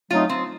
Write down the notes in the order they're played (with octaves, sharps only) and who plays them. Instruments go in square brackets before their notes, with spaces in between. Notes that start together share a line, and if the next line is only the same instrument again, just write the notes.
[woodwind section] F#3 A3 C4 D#4 [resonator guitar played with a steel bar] F4
[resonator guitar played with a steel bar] C4